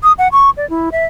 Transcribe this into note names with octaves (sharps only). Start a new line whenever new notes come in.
D#6
F#5
C#6
D5
E4
E5